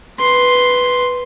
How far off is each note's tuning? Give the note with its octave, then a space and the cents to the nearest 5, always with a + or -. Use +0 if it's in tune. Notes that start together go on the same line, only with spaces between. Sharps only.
B4 +0 C6 +0